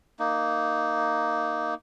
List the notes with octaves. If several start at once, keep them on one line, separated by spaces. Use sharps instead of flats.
A#3 D#4